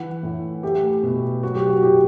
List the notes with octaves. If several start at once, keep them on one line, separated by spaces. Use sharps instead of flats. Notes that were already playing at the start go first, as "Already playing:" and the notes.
Already playing: E3 F#5
A2
A3 G4
B2
F#3 F#4
G4
F#4
A2 G4